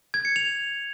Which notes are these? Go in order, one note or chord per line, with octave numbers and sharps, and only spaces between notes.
G#6
C#7
F7